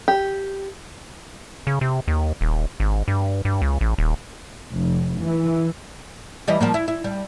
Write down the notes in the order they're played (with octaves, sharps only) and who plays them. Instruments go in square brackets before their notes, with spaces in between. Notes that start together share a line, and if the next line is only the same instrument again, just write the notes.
[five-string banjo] G4
[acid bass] C#3
C3
D#2
D#1
G#1
G2
G2
C#2
A1
D#1
[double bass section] F1
E3
[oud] E3 G3 D#5
F3 G3 A#3
E4
E4
G3